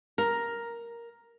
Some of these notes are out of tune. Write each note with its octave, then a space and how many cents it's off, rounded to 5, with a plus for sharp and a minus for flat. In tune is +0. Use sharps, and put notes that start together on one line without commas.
A#4 +5